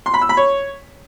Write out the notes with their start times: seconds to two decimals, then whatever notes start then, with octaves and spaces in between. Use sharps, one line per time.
0.06 C6
0.14 B5
0.22 E6
0.29 B5
0.37 C#5